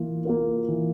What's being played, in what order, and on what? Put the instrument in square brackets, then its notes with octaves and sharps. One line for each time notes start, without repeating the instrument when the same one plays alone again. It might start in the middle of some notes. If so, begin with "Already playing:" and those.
Already playing: [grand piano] E3 A#3 F4
A#3 F4 A#4
E3